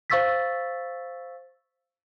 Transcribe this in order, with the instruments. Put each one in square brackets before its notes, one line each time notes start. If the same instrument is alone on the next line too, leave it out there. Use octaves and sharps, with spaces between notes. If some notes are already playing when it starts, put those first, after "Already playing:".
[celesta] C5 F5 C#6 E6 A6 B6